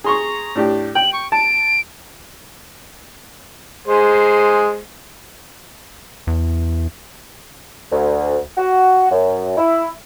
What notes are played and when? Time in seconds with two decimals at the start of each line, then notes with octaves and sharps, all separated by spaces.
0.04 G#4 A#5 C6 C#6
0.55 A2 D4 G4
0.95 G5 F#7
1.13 C#6
1.32 A5 D7
3.87 G#3 G#4 C5
6.27 E2
7.92 D2
8.58 F#4
9.12 F#2
9.57 E4